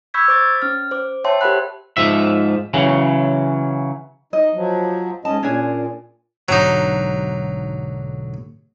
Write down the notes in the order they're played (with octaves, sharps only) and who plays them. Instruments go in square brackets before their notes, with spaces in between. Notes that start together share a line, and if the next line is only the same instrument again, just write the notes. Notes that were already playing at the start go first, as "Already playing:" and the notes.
[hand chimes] B5 C#6 E6 G6 G#6 B6
C5 D6 A6
C#4 F6
C5 D6
C#5 E5 G5 A5 C6
G4 A#4 C5 F#5 B5 F#6
[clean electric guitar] G#2 F3 E5
C#3 E3 F#3
[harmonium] D#4 [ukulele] D#5
[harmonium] F3 F#3
[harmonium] G#2 C#4 D#5 [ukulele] A5
[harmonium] A#2 [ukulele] C#4 D4 G#4
[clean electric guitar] B1 G#2 D3 [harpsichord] F#3 D#4